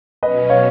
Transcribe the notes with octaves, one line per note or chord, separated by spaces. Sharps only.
B2 F#3 C#4 B4 D#5
C#5 F5